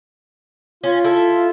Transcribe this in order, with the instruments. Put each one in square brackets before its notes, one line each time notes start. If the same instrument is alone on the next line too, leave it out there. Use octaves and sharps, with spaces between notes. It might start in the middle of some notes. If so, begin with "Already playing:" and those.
[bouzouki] C#4 [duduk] F4
[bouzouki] E4 A4